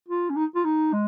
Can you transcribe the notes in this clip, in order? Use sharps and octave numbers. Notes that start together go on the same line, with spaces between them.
F4
C#4
D#4
F4
D#4
G#3